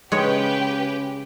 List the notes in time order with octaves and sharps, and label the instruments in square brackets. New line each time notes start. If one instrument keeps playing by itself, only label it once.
[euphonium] C#3 [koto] G#3 C#5 [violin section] G4 B4 G5